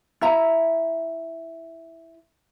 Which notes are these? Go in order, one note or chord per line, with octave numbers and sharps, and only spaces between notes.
E4 E5 A#5